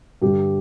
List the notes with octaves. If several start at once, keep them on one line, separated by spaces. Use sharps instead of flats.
G2 D3 G4